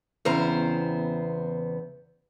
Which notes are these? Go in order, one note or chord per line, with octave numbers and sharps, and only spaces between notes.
E2 C#3 B3 C4 C5 A#5